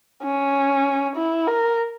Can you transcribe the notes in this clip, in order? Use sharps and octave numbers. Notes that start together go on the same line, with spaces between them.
C#4
E4
A#4